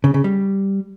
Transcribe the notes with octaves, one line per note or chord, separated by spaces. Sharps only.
C#3
C#3
G3